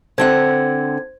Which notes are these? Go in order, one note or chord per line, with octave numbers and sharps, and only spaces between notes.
D3 C4 C5 F#5 G#6